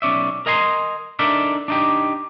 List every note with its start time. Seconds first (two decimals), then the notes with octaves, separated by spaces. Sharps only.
0.02 B1 C#4 D5 E5
0.46 A#4 D#5 G#5 A#5 C6
1.19 D4 D#4 A4 A#4 D5 E5
1.68 D4 D#4 G4